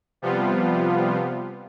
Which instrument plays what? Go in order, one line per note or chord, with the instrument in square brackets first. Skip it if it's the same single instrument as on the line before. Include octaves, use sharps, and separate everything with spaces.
[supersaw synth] C3 F3 G3 B3 F4